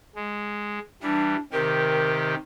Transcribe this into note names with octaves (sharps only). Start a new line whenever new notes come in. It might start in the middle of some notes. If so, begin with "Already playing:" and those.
G#3
E3 G3 D4
C3 D#3 G4 A#4